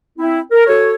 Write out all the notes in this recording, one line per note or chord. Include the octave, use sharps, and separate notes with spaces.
C4 E4
A#4
F#4 A4 C#5